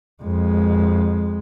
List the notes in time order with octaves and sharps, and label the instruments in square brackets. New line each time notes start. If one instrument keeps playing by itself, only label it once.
[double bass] F2 G#3